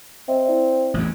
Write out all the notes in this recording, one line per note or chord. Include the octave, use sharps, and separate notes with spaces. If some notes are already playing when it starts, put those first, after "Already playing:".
C4 D#5 E5
E4 D5 E5
A1 E2